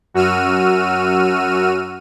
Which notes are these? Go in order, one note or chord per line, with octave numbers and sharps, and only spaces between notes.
F#2 F#4 E6 F6 D#7